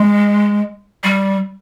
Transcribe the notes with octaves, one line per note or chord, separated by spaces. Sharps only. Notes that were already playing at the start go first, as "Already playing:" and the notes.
Already playing: G#3
G3